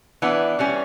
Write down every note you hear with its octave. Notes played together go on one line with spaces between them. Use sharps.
E3 B3 D4
E3 G3 C#4